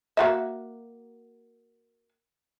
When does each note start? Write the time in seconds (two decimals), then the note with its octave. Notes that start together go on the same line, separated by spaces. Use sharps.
0.17 A#3 F#4 E5